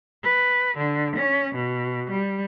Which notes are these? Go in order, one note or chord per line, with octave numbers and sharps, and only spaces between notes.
B4
D3
C#4
B2
G3